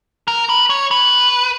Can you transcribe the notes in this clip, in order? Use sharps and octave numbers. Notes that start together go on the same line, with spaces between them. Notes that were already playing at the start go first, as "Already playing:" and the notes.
A#4
B4
C#5
B4